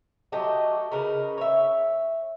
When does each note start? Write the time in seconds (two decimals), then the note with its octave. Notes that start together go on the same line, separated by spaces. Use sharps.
0.32 F#3 A3 G4 D#5
0.92 C#3 D#4 A#4 B4
1.38 C#5 E5